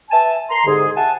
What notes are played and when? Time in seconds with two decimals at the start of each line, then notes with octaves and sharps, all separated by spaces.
0.11 B4 E5 G#5 A5
0.50 A#5 C6
0.66 C2 G#2 D3 G#4
0.96 E5 F#5 G#5 A5